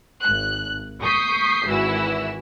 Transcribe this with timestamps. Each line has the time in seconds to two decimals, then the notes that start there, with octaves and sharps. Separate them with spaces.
0.21 G#1 F#6
1.01 C#6 D#6 G6 B6 C7
1.69 G#1 E3 E4 F#4 E6